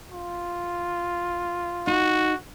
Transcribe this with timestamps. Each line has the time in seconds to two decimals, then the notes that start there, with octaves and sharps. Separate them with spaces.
0.11 F4
1.87 D#4 F#4